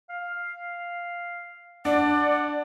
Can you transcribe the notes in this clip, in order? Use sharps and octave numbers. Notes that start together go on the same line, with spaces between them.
F5
D4 D5 F#5